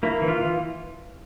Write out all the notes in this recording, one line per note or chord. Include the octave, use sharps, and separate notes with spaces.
A#3 E4
E3
F4
E3